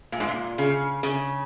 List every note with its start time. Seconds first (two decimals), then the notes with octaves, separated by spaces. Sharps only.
0.12 A#2
0.20 G#2
0.28 A#2
0.58 C#3
1.03 C#3